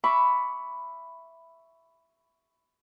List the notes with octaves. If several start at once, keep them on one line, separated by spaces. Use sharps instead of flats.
E5 B5 C#6 D6